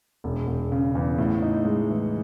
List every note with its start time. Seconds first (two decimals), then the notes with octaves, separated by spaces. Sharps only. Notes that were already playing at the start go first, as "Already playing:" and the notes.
0.24 E1
0.47 E1
0.72 C#3
0.95 E2
1.18 A2
1.42 D#4
1.65 G#3
1.89 E3